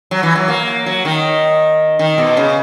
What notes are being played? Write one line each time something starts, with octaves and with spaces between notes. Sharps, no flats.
F#3
E3
F#3
A#3
F#3
D#3
D#3
B2
C#3